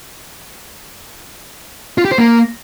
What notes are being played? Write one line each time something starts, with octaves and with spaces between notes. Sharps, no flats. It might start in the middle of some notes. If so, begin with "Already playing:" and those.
F4
G4
C5
A#3